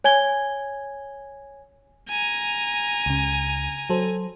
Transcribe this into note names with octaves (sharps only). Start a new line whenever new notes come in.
C#5 G#5 G#6 G7
G#5 A#5
C#2 C#3
F#3 A4 C5